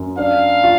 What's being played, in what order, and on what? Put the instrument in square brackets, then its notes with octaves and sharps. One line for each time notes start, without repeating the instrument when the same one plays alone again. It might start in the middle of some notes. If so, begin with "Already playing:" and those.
Already playing: [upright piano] F#2
[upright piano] D4 [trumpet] F5
[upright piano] F4